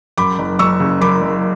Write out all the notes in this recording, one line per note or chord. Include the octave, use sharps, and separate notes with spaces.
F#2 B5 D6
F#1
F#1 C#6 E6
C#3
F#2 B5 D6
F#1